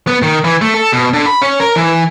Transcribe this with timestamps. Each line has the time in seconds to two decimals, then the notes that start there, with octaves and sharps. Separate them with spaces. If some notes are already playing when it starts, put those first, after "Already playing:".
0.07 B3
0.23 D#3
0.44 E3
0.62 A3
0.74 A4
0.93 B2
1.13 D3
1.26 B5
1.42 C#4
1.60 A#4
1.76 E3